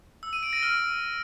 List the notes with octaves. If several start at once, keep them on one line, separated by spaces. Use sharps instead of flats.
E6
D#7
D7
A#6
F6